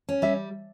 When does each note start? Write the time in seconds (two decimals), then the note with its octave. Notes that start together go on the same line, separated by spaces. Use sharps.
0.09 C#4
0.22 G3 E5